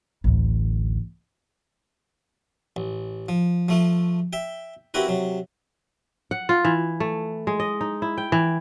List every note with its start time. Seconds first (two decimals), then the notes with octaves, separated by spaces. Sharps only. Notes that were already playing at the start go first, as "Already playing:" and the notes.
0.24 A1 D2
2.76 A1
3.29 F3
3.68 F3 A3 F4
4.33 E5 G5
4.94 C4 E4 F#4 G4 A#4 B4
5.08 C3 F#3
6.31 F#5
6.49 F4
6.65 E3
7.00 A3
7.47 G#3
7.60 D#5
7.81 D#4
8.02 E4
8.18 G5
8.32 E3